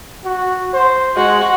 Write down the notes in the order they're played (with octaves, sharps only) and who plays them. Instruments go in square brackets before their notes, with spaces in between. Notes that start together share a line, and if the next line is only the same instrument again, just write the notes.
[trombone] F#4
C5
[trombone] G#3 [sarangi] F#4